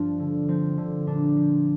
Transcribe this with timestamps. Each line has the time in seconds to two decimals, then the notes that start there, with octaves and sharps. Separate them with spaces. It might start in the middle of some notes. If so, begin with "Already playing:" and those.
Already playing: G2 F3 D4 F4
0.19 D3
0.48 F3 C4
0.77 D3
1.07 A#2 D4
1.36 F3